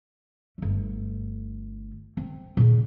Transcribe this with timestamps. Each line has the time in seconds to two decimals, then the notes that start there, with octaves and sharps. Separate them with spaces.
0.58 G1 A3
2.17 C4
2.57 A#2 C#3